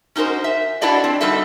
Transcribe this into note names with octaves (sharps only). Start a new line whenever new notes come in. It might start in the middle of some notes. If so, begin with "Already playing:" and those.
C#4 D#4 F#4 A#4 C5
E5
D4 E4 F#4 A4 D5 D#5
C4
G3 A3 D#4 F#4 A4 E5